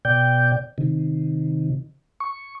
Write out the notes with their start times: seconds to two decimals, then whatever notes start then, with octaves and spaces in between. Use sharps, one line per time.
0.05 B2 D5 G5 G6
0.78 C3 D#3
2.20 C#6